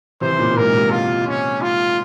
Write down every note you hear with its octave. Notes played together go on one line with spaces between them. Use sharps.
C3 E3 C5
E3
A#2 C#3
A#2
G#2 C3 A#4
C#3
G#2 C3
F4
C#4
F4